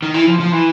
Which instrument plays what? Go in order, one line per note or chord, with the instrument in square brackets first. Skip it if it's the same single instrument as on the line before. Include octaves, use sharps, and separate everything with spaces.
[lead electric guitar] D#3
E3
F3
F3
E3